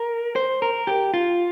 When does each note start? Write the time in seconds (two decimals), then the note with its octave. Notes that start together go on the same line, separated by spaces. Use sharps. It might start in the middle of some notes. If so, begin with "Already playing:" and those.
Already playing: A#4
0.36 C5
0.62 A#4
0.87 G4
1.14 F4